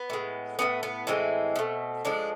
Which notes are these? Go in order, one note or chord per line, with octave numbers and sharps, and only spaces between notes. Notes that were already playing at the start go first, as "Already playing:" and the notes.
Already playing: B3
A2 G#3
A2 F3 A3 B3
B3
A2 E3 G#3 C4
B2 A3
A2 F3 G#3 D4